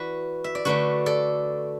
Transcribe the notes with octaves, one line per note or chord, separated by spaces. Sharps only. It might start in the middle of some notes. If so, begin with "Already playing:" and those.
Already playing: E3 E4 F#4 B4 D5
E5
D5
D3 A3 D4 F#4 B4
A4 D5